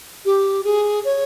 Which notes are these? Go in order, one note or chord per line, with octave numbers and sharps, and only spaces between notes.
G4
G#4
C#5